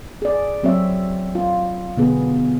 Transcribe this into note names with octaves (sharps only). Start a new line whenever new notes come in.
G#4 D5
F#3 C4 C#5 E5
F4
B2 D3 B3 G#4